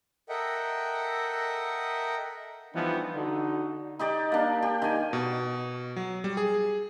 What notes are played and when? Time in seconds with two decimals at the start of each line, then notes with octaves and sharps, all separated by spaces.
0.29 A4 A#4 D#5 E5 F#5 G5
2.74 E3 F3 G3 B3 D4 D#4
3.15 D3 D#4 F#4
3.99 D#4 G4 D5
4.32 A#3 D4
4.63 G4
4.82 D#3 G#5
5.13 B2
5.96 F#3
6.24 G3
6.37 G#4